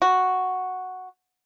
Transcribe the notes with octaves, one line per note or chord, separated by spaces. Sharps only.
F#4